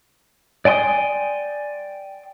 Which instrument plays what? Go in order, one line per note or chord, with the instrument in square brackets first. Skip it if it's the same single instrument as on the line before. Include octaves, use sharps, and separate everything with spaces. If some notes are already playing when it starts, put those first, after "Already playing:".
[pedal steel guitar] D5 G5 G#5 C6 D#6